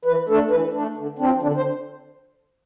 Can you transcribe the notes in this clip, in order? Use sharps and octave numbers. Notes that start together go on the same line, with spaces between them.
E3 B4
A3 D4 A4
E3 B4
A3 D4
D3
F3 C4 D4
D3 D4
C5